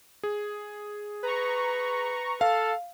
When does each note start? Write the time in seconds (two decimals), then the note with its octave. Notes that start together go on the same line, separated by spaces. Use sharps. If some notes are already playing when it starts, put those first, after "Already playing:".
0.23 G#4
1.23 B4 A#5 C#6
2.41 A4 F5